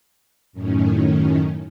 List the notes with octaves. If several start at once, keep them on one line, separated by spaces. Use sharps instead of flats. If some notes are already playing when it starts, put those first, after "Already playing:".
F#2 A2 D#3 C#4